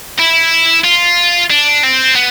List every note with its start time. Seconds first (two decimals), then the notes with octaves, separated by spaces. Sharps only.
0.19 E4
0.84 F4
1.50 D4
1.83 C4
2.15 B3